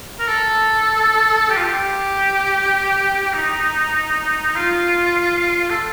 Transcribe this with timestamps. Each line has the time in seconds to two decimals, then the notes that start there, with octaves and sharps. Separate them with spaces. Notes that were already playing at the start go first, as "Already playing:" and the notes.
0.19 A#4
0.27 A4
1.49 G4
1.56 F4
1.63 G4
3.34 D#4
4.56 F4
5.70 A4